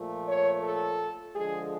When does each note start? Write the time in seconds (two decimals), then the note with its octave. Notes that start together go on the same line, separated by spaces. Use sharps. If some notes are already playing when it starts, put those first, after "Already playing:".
Already playing: A#2 F3 A3
0.27 C#5
0.63 A4
1.35 D3 F3 G#3 G#4